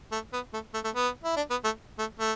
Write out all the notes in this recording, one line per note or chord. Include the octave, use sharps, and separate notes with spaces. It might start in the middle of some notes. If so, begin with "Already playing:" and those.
A3
B3
A3
A3
A3
B3
E4
D4
B3
A3
A3
A3